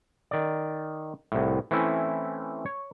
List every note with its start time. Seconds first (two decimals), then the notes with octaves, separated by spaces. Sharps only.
0.31 D#3 D5
1.32 C2 A2
1.71 E3 A3 C4 C#4 E4
2.66 C#5